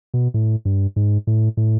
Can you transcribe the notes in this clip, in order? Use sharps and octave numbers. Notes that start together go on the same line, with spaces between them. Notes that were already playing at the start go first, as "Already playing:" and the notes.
B2
A2
G2
G#2
A2
A2